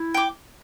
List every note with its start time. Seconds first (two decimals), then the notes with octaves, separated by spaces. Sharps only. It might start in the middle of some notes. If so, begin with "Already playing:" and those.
Already playing: E4
0.14 G5 D6